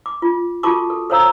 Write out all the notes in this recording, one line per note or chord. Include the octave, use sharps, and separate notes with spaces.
D6
F4
F4 F#4 A4 A5 C#6 D6
A4
A4 C5 C#5 F5 A#5 E6